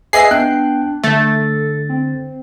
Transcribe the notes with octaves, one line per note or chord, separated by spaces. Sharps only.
G#4 B4 D#5 E5 C7
B3 D4 G5 F#6
D3 A3 A4 A6
C4